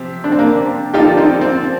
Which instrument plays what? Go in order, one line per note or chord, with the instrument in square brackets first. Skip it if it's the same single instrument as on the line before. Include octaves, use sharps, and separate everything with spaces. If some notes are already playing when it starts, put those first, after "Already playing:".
Already playing: [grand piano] C3 F3 C4 G4
[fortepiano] D4
C4
A#3 D4
[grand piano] F3 A#3 F4 A4 D5 [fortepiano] D#4 G4
[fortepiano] C4 D#4
C4